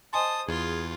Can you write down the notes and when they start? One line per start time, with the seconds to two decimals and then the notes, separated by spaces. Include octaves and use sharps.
0.13 C5 D#5 G#5 A5 C6 D#6
0.48 E2 F4 G#4